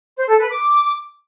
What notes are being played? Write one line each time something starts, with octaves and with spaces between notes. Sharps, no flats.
C5
A4
B4
D6